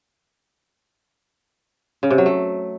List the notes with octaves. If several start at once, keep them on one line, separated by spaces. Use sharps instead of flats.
C#3
C3
F#3
A3